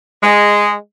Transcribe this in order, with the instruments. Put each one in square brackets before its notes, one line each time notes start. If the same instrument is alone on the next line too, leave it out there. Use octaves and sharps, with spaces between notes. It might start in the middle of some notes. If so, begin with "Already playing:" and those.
[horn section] G#3